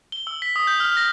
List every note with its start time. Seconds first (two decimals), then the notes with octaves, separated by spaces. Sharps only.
0.12 G7
0.27 E6
0.42 B6
0.56 D#6
0.67 G6
0.80 F6
0.97 A#6